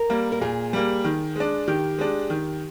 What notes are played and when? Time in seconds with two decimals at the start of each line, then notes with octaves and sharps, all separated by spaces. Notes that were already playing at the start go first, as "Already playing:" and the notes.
Already playing: A#4
0.10 G3 A#3
0.32 A#4
0.41 A#2 G#4
0.73 G3 A#3
1.04 D#3
1.36 G#3 D4
1.68 D#3 G4
1.99 G#3 D4
2.30 D#3